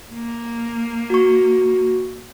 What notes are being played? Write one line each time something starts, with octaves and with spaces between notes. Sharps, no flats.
A#3
F#4 C#6